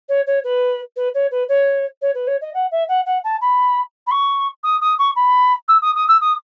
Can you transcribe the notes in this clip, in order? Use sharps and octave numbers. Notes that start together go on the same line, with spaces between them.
C#5
C#5
B4
B4
C#5
B4
C#5
C#5
B4
C#5
D#5
F#5
E5
F#5
F#5
A5
B5
B5
C#6
D#6
D#6
C#6
B5
E6
D#6
D#6
E6
D#6